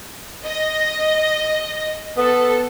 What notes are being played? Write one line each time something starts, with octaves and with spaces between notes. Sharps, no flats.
D#5
B3 A4